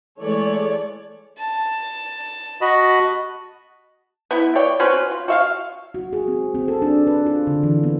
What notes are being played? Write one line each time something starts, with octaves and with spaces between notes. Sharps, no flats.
E3 G#3 A3 A4 C#5 D5
A5
F#4 D#5 B5
B3 E4
C#5 D5 G5
C4 C#4 F#4 B4
F4
F#4 E5 F5
F#4
G#4
C4
C4
A4
D4
B4
F4
D3
E3
B3